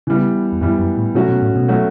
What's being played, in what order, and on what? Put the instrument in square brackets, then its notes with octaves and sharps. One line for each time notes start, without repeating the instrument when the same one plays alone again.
[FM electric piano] C#3 [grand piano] E3 G3 B3
[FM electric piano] E2
[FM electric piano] F#2 [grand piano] E3 G3 B3
[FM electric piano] F#2
A2
[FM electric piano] B2 [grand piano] F#3 A3 C#4 F#4
[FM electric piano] B2
A2
B2
[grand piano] F#3 A3 C#4 F#4